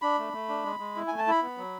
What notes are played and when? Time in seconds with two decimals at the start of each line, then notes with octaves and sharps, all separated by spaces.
0.02 D4 B5
0.18 A3
0.33 A3
0.49 D4
0.65 G#3
0.80 G#3
0.96 E4
1.08 A3 G#5
1.18 A5
1.27 E4 B5
1.42 B3
1.58 F#3